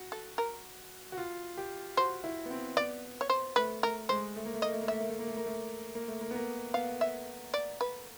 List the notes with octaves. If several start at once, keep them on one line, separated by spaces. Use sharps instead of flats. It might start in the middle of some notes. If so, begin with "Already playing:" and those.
Already playing: F#4
A4
A#4
F#4
F4
G4
F#4 C5
E4
B3
C4
B3 D5
C#5
C5
A3 B4
A3 A#4
G#3 C5
A3
A#3
A3
A#3 D#5
A3
A#3
A3 E5
A#3
A3
A#3
A3
A#3
A3
A#3
A3
A#3
B3
A#3
B3 F5
E5
D5
B4